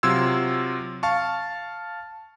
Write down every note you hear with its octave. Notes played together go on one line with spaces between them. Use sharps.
C3 F#3 F4 C6 E6 G#6
F5 A5 C#6